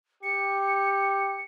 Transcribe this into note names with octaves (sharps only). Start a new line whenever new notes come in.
G4 C#7